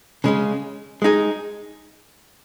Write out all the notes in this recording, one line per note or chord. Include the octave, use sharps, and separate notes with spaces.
C#3 G#3 C#4
G#3 D#4 G#4